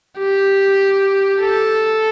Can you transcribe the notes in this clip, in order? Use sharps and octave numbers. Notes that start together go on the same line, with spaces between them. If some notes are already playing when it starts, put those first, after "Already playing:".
G4
A4